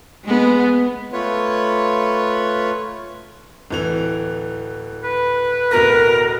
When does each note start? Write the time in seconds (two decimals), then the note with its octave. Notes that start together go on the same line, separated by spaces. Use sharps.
0.24 G#3 B3
1.13 A3 F4 B4 C#5
3.71 D1 E3 F7
5.04 B4
5.71 D1 B2 A#4 A#6